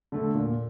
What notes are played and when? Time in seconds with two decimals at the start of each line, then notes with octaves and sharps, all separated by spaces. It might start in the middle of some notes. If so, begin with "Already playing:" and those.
0.12 D3 A3
0.34 A#2